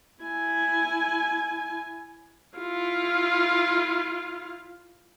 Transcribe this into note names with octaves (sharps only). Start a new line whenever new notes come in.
E4 G#5
E4 F4